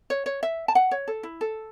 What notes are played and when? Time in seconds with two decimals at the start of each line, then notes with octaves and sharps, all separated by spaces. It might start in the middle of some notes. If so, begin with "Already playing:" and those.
0.10 C#5
0.26 C#5
0.43 E5
0.68 A5
0.75 F#5
0.91 C#5
1.08 A4
1.23 E4
1.41 A4